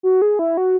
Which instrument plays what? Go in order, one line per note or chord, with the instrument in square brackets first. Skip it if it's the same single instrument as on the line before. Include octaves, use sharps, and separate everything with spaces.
[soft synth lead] F#4
G#4
E4
F#4